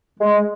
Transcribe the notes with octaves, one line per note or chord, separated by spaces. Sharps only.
G#3